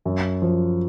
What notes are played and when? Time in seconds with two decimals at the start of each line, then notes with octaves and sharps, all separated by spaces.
0.05 F#2
0.42 F3